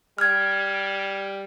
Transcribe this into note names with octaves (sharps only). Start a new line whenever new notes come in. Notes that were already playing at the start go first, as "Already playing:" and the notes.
G3 F6 G#6